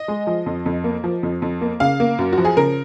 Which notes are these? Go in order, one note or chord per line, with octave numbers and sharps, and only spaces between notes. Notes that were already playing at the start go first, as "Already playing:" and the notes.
Already playing: D#5
G#3
F3
F2
F2
A#3
F3
F2
F2
A#3
C#3 F5
A#3
F#2
F#4
F3
G#4
C#3 A#4